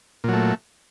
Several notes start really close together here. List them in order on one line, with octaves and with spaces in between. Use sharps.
A#2 F#3 A3